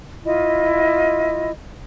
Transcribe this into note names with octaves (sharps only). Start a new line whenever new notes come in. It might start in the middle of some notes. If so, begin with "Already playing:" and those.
E4 F4 D#5